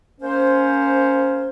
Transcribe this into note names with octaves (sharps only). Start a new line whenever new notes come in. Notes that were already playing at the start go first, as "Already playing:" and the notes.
A#3 C#4 C5